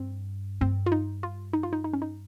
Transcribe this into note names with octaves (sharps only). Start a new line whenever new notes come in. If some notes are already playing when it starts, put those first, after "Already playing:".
Already playing: G2 C4
G2 C4
F4
D#4
F4
D#4
F4
D#4
D#4
C#4
D#4